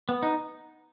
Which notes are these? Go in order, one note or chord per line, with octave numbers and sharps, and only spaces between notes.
B3
D#4